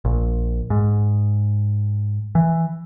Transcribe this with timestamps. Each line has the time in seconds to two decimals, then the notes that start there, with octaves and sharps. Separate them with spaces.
0.05 A#1
0.70 G#2
2.35 E3